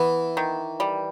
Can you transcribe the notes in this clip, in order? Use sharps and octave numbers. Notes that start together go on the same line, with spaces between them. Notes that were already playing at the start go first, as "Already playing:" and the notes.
Already playing: E3 B3
D#3
G3